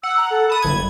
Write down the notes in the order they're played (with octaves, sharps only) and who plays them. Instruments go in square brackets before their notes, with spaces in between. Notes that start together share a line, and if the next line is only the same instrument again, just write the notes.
[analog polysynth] F#5 [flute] E6
[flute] A#5
A4
[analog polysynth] A5 D#6 [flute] B5
[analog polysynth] G1 G#6